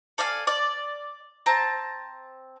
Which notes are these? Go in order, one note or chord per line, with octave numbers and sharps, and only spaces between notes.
A4 D5 F5 G#5
D5
C4 A5 A#5